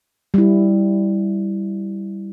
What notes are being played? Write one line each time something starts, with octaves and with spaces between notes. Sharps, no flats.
G3 E4